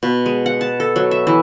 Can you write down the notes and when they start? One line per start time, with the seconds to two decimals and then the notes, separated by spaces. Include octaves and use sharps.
0.03 B2
0.26 G#3
0.46 F#5
0.61 A5
0.80 A4
0.96 F#3
1.11 E5
1.27 E3